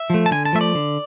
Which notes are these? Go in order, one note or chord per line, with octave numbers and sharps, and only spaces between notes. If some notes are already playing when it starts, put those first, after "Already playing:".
Already playing: E5
F3 A3
A5
D3 G#5
A5
F3 A3 E5
D5
D3